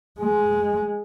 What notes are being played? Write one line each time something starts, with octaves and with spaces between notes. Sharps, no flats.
G#3